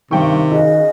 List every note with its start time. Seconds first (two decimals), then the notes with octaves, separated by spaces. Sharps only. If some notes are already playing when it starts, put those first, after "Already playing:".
0.11 G2 C3 D#3 G5 C#6
0.51 C#3 F#4 D#5